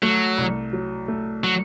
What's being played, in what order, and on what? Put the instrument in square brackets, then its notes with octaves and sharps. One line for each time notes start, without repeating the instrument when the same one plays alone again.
[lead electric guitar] F#3 [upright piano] A3
[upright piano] C2
F#3
A3
[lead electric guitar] F#3